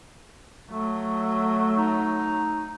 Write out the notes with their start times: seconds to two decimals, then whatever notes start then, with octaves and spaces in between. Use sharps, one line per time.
0.71 F#3 A3
1.77 D#4